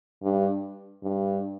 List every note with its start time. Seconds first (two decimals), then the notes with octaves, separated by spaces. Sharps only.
0.23 G2
1.03 G2